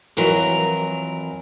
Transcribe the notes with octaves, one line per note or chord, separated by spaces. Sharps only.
F2 E3 F#3 A#4